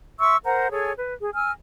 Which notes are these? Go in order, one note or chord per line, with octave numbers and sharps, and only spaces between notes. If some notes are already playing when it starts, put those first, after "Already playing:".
E5 C6 C#6 E6
A#4 C5 F#5 A#5
G#4 A4 C#5 G#5
B4
G#4
G#5 E6 F6